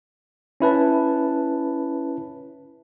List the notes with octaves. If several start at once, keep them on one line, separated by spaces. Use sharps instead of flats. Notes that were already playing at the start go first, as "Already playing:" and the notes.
C#4 E4 B4 A5